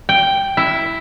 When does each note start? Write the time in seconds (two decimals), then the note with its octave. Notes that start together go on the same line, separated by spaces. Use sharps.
0.09 G5
0.57 E4